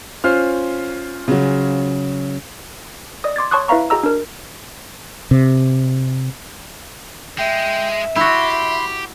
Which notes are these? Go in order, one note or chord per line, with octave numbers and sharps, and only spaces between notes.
C#4 F4 C5 F6
C#3 F#3
D5 D#5 D#6
C6 D6 G#6 A6
C#5 A5 C6 C#6 D#6 F#6
E4 B4 E5 F5 A#5 C#6
F#4 G#4 D#5 A#5 E6
D4 A#4
C3
G#3 E5 G5
E4 F#4 G4 B5 C6